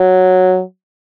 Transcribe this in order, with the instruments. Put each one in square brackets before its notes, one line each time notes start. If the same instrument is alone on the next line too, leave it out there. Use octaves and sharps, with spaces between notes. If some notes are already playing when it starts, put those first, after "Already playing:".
Already playing: [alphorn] F#3